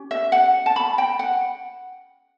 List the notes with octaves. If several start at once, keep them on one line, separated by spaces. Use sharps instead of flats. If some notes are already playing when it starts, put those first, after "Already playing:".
Already playing: C#4 G4
E5
F#5
A5
B5
G5
F#5